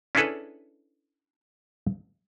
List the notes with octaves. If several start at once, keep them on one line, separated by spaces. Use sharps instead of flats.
C#4 D4 E4 G#4 A4 B4